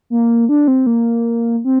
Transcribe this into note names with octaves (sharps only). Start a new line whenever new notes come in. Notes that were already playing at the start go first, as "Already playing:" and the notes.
A#3
D4
C4
A#3
C4